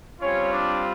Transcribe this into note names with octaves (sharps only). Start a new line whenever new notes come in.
G3 C4 C#4 F4 C#5
D4 D5